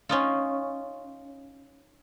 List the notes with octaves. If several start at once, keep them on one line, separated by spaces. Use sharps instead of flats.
C#4 D#4 F4